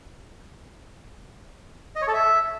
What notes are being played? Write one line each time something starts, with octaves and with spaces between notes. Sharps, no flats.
D#5
C#5
A4
E5